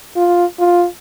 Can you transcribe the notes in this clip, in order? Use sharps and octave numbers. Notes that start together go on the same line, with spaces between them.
F4
F4